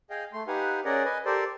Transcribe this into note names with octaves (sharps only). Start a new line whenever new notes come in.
G#4 D#5 F5 G5
A3 C6
D#4 G4 B4 F5 F#5 G#5
C#4 G#4 A#4 D5 D#5 F#5
B4 D#5 G#5
G4 A4 A#4 C5 D5